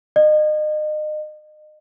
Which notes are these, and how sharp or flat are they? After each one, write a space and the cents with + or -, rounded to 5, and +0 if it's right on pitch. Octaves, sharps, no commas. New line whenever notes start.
D#5 -35